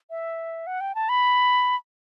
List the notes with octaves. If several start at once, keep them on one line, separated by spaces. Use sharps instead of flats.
E5
F#5
G5
A5
B5